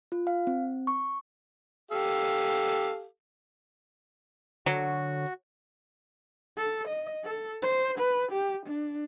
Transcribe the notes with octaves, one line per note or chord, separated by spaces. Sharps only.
F4
F5
C4
C#6
G4 A4 F5
D3 F#3 F#4
A4
D#5
A4
C5
B4
G4
D4